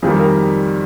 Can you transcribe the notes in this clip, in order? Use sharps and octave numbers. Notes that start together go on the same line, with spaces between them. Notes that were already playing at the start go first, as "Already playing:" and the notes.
F2 D#3 G3 G#4
A#4